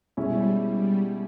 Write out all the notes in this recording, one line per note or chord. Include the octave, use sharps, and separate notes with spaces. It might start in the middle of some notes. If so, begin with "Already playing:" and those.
B2 G3 G#3 C#4 E4
G3